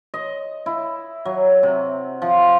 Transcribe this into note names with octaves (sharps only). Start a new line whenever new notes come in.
D#5
E4
F#3
C3
F3